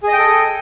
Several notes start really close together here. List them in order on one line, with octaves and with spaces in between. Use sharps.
G#4 D#5 G5 A4